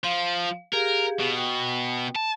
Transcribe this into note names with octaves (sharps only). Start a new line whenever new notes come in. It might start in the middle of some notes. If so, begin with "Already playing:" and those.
F3 F5
G4 G#4 A#4 F5
B2
G5
A5